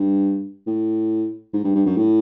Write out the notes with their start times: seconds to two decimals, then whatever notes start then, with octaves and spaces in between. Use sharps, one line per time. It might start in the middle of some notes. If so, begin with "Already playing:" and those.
Already playing: G2
0.67 A2
1.53 G#2
1.64 G2
1.75 G2
1.86 F#2
1.97 A2